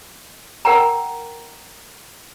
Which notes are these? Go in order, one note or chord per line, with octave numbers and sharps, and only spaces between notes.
A#4 F#5 G5 A#5